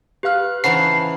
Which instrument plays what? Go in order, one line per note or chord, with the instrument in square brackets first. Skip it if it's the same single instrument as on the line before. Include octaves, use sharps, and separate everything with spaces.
[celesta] G4 F5 F6 [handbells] B4 F#6
[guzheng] C#3 E3 D#4 [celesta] C5 [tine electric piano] F#5 C7 [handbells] A5 B5